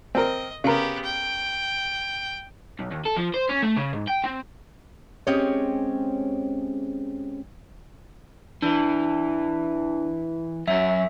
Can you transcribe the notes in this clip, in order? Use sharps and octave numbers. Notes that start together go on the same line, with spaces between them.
C4 A#4 D#5
C#3 B3 G4 A#4
G5
B1
D#2
A4
F3
C5
C#4
A3
C#3
G#2
G5
C4
G#3 C4 C#4 G4 G#4 C#5
E3 D4
F#2 C#4 E5